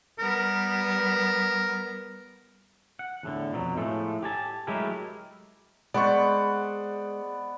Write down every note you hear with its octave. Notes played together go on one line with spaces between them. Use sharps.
G3 B3 A#4
F#5
E2 A2 D3
F2 B2 F#3
A2 F3 G#3 A3
G4 G#5 A5
F#3 G#3 A3 E4 G4 A#4
G#3 B3 C5 D5 F#5 C#6